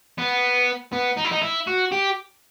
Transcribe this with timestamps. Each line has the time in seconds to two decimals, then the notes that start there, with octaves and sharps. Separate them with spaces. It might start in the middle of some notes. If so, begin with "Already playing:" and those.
0.18 B3
0.93 B3
1.17 D#4
1.25 E4
1.32 D#4
1.42 E4
1.67 F#4
1.92 G4